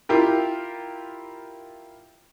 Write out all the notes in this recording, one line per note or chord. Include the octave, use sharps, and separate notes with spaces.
E4 F4 G4 A#4